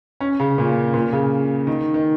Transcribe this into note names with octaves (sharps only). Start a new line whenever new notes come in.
C#4
C#3
A#2
A#2
C#3
D#3
D#3